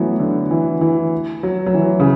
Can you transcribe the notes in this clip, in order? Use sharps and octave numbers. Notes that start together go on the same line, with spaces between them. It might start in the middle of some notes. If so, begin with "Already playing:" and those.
Already playing: E3 F#3 A3 B3 C#4
D3
E3
E3
F#3
F#3
E3
C#3